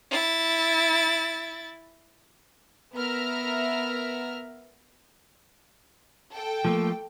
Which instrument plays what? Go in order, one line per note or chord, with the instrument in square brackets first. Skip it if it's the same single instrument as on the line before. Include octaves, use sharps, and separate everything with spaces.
[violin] E4 A6
[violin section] B3 A#4 E5 A#5 F6
A4 G5
[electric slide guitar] F3 A3 A#3